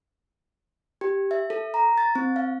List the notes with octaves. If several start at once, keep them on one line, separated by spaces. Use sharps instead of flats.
G4
E5
A4
A#5
A6
C4
F5